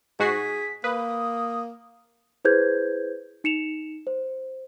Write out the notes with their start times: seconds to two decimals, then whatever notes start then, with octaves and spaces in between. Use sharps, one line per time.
0.20 G#2 F#4 G#4 B6 C7
0.84 A#3 B4 D#6
2.45 E4 G#4 B4 C5 G6 G#6
3.44 D#4 C#7 E7 F7
4.07 C5